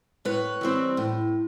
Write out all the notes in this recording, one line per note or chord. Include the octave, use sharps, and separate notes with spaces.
A2 B4 C#5
E3 G3 C4
A2